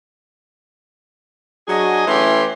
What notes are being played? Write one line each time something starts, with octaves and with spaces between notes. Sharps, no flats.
F#3 D4 F#4 G#4 D#5 G#5
E3 A3 C#4 E4 G4 C6